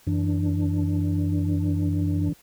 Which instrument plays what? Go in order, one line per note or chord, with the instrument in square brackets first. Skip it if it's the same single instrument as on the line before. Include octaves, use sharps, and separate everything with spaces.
[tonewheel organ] F#2 E3 D4